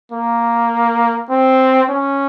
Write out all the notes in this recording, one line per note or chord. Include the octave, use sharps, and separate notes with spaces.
A#3
C4
C#4